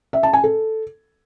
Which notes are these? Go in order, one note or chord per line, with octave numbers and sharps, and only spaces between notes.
E5
A5
G#5
A4